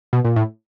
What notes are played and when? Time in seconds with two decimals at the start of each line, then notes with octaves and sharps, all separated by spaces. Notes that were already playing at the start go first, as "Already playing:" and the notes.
0.13 B2
0.25 A#2
0.36 A2